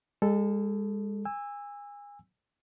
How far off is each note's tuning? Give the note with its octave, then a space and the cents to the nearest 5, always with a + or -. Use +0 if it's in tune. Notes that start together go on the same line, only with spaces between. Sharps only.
G#3 -35 A4 +0
G#5 -25 E6 +0